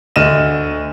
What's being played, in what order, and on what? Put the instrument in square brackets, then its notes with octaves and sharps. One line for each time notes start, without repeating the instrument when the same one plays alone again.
[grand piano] D2 D3 D#5 F6 D#7 E7